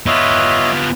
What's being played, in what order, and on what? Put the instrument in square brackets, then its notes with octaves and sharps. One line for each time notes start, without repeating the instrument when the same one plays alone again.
[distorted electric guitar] B3 F4 [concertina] C#5 D#5 E5